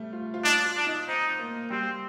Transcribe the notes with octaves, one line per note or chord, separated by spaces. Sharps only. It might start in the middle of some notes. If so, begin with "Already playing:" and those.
Already playing: G3 A3
F4
F4
D4 D#4
F4
D4
D#4
C4 D#4
A#3
G3 C4